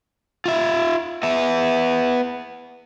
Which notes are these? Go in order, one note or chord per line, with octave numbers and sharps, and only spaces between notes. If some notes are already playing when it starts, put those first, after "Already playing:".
F4 E5
B3 E5